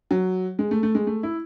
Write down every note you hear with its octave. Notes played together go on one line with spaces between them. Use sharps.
F#3
G#3
A3
A3
G#3
A3
E4